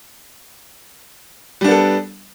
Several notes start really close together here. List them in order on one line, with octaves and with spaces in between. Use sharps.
G3 D4 B3 A4